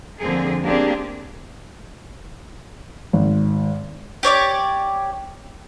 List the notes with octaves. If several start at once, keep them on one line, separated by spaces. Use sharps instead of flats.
F2 D3 F3 A#3 C4 G#4
A#3 C4 D4 G4 G#4
G#1
G4 C#5 D5 D6